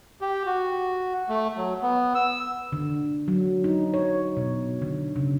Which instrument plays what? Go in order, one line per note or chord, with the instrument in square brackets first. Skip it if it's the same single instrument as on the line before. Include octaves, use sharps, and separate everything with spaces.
[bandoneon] G4
F#4
A3
F#3
B3
E6
[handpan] D3
F#3
D#4
C#5
B2
D3
C#3